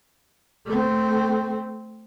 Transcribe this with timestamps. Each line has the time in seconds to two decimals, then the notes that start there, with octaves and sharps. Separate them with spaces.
0.65 A3 C4